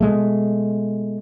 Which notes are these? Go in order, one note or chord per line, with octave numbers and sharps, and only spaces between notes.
B2 G#3 A3